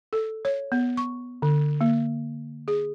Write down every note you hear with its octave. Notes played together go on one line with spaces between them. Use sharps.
A4
C#5
B3
C#6
D3
A#3
G#4